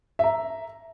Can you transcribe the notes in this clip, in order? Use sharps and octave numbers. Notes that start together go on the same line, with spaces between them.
E5 A#5